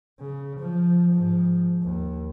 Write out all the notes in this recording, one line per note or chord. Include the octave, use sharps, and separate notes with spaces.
C#3
F3
G#2 F3
D#2